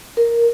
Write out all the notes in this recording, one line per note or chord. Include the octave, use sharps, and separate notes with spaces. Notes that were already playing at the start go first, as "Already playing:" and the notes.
A#4